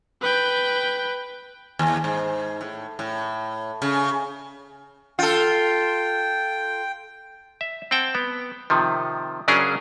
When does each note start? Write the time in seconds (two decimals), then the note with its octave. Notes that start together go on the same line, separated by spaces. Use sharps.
0.21 B4 G5
1.79 D#2
2.04 G#2
2.61 A2
2.99 A2
3.82 C#3
5.19 F4 A4 G5
7.61 E5
7.91 C4 F#5 G5 A5
8.15 B3
8.70 C3 D#3 F3
9.48 C#3 F#3 C#4 D4 G#4 A#4